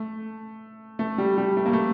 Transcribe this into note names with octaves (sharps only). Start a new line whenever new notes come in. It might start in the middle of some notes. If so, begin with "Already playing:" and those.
Already playing: A3
A3
G3
G3
A3
A#3
A3